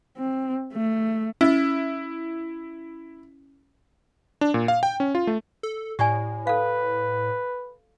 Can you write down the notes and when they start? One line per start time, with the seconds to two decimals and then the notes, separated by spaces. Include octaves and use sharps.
0.17 C4
0.73 A3
1.41 C#4 E4
4.41 D4
4.54 A#2
4.68 F5
4.83 G5
5.00 C#4
5.15 F4
5.27 A3
5.63 A4
5.99 A2 G4 D5 G#5
6.47 A4 B4 F5